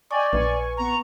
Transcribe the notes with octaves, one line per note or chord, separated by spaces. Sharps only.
D5 D#5 G5 G#5 C#6 D6
A#1 B4 G#5 C#6
B3 A#5 C#6